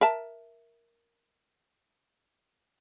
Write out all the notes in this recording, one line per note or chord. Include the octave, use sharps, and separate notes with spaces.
A#4 E5 A5